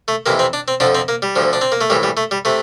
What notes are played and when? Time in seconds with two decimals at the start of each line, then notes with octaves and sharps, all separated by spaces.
0.08 A3
0.26 F2 C3 E3 A#3
0.39 C4
0.53 D4
0.68 C4
0.80 F2 D3 F3 D4
0.95 C4
1.08 A#3
1.22 G3
1.36 D2 D3 F3
1.53 D4
1.61 C4
1.72 A#3
1.81 A3
1.90 A#1 A2 E3 G3
2.03 G3
2.17 A3
2.31 G3
2.45 C3 A3